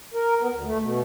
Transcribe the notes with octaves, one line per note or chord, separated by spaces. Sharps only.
A#4
B3
D2
A3
B2